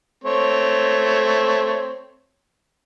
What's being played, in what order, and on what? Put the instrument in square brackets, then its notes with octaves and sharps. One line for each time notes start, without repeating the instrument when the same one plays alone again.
[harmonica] A3 C4 C#5